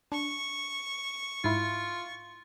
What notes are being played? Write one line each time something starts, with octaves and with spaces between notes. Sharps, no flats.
D4 C#6
G#2 E4 F4